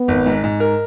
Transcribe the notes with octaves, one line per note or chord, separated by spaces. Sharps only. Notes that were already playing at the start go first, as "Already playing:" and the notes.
Already playing: B3
G#1
G#2
G#2
A#4